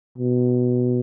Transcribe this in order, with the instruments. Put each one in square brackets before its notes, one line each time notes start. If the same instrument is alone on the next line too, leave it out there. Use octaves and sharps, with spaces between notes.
[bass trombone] B2